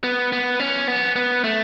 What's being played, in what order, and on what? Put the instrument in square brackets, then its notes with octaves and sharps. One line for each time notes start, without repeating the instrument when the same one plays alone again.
[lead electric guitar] B3
B3
C#4
B3
B3
A3